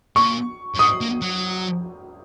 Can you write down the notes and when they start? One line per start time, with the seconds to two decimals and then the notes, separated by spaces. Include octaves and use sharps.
0.16 A#2 C#6
0.75 F#2
0.79 G#2 D#6
1.01 A#3
1.22 F#3